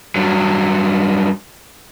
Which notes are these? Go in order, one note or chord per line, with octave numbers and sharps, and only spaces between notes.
G2 F#3